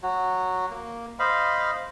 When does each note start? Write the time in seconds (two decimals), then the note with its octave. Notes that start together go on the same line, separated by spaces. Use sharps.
0.03 F#3 F#4
0.70 A#3
1.19 C5 D#5 F5 B5